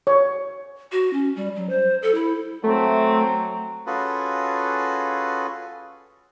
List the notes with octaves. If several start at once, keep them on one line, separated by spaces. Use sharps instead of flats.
C#5
F#4
C#4
G3
F#3
C5
A4
E4
F#3 A3 C4
C#4 F4 F#4 G#4 A4 B4